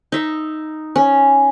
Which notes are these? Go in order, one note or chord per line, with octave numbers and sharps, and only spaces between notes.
D#4 E5
C#4